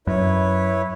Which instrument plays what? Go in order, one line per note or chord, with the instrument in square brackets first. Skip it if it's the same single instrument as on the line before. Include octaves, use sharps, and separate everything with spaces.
[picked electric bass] F#2 [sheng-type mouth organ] E4 B4 C#5